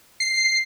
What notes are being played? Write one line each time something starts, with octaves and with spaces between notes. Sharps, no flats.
C7